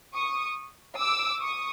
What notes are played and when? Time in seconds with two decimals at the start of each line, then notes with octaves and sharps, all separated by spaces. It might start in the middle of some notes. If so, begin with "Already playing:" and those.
0.15 C#6 D#6
0.99 D6 E6
1.41 C#6 D#6